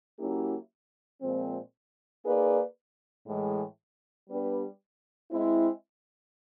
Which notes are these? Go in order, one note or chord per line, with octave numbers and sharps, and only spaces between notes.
F#3 A#3 C#4 E4 G4
A#2 F3 G#3 C4
A#3 D#4 G#4 B4 D5
A2 E3 G#3
G3 B3 D4 G4 B4
G#3 C4 E4